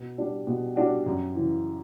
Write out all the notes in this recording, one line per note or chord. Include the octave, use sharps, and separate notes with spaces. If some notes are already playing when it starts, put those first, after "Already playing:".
Already playing: B2
G3 D4 F#4
B2
G3 D4 F#4
F#2
C#3 E3